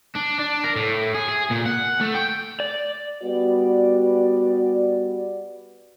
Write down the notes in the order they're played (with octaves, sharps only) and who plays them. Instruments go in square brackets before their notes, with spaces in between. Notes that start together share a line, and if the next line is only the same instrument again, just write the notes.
[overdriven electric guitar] D4
D4
A#4
A2
G#4
G#4
A#2
F#5
A3
G5
[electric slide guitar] D5
[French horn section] G3 B3 F#4 D5